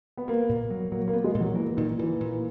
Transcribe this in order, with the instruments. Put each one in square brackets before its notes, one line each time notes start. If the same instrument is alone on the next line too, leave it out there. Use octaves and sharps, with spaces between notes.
[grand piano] B3
[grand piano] A#3 [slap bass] B3
[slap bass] A#2
F#3
[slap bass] F#3 [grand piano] A#3
[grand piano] A#3
[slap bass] B3
[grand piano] G#3
[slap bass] A#2
[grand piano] F#3
[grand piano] E3 [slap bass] A#3
[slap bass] A#2 [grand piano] D#3
[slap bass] A#2 [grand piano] E3
[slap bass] A#2